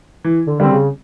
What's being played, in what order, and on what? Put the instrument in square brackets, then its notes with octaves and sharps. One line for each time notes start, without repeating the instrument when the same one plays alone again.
[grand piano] E3
[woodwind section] D3
[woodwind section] D3 [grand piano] G3 C4
[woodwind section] C#3